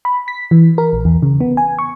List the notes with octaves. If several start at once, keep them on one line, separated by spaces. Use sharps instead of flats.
B5
B6
E3
A#4
A#1
E2
C#3
B3
G#5
C#6